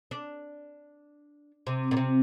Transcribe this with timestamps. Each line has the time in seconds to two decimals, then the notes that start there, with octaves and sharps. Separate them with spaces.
0.11 D4
1.67 C3
1.91 A#2
1.97 C3